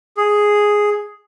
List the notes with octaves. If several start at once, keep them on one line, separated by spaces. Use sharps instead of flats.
G#4